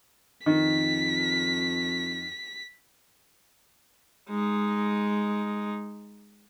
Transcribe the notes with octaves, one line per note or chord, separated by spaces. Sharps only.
F2 D#3 B6
G#3 D#4